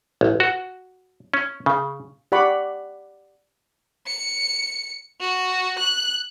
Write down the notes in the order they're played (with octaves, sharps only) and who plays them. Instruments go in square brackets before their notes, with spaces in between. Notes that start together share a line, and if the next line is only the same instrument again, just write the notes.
[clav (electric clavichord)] A1
F#4
C#4
C#3
[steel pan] G4 D5 F#5 B5 C#6 D6
[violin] C#7
F#4
F#6